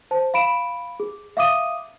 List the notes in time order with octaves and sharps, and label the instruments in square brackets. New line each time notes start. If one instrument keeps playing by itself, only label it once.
[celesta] C5 A5
F5 B5 D7 E7
G#4
E5 F5 D6 D#6 D#7